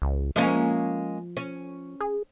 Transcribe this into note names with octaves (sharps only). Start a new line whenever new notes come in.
C#2
F3 G#3 A#3 C#4
C#4
G#4